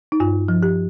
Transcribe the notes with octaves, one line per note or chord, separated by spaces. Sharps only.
D#4
G2 F4
F3
G4